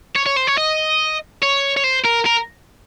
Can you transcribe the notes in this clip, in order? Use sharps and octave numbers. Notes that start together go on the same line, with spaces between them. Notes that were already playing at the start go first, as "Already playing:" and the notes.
C#5
C#5
C5
C#5
D#5
C#5
C#5
C5
A#4
A#4